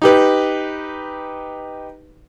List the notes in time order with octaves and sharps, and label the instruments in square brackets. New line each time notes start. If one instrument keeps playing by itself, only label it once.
[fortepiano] D#4 G4 B4